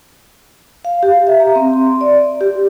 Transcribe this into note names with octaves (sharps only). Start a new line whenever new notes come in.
F5
G4
E5
A#5
C4
C6
D5
G4